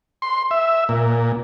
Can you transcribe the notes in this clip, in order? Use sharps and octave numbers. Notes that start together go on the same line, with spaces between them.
C6
E5
A#2